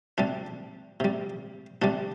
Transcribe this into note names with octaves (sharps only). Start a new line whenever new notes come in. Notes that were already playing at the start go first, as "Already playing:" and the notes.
C3 G3 D4
C3 G3
C3 G3 D4